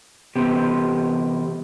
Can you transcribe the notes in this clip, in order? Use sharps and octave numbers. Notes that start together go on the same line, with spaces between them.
E2 C3 B3 G4